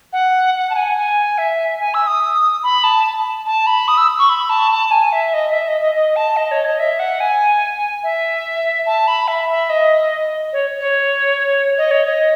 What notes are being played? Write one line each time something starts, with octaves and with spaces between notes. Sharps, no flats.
F#5
F#5
A5
G#5
G#5
E5
G#5
E6
D#6
B5
A5
A5
B5
D#6
E6
C#6
B5
A5
A5
G#5
E5
D#5
D#5
E5
D#5
D#5
D#5
A5
D#5
C#5
D#5
E5
F#5
G#5
E5
A5
B5
E5
E5
D#5
C#5
C#5
D#5
C#5
D#5